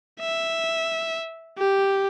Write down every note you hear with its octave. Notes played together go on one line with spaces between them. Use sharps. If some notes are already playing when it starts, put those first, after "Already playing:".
E5
G4